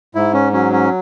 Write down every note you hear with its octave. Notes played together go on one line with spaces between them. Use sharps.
G#2 E4
C#4
F#3 C#4
C#4